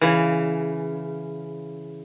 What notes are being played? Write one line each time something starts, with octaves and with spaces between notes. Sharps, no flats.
C#3 E3